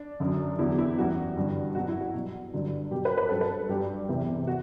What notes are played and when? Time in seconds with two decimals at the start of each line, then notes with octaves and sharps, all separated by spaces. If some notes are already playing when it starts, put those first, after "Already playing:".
Already playing: D4
0.20 F#2 D3 F#3
0.59 E2 D3 F#3 E4
0.78 E4
0.98 F#2 E3 G3 F#4
1.36 G2 D3 G3
1.75 B2 F#3 F#4
1.88 E4
2.01 F#4
2.14 B2 G3
2.54 G2 D3 F#3
2.91 B2 F#3 G4
3.05 B4
3.17 B4
3.29 G2 F#3 A4
3.41 B4
3.69 G2 F#3 G4
4.09 E2 C3 E3
4.47 F#4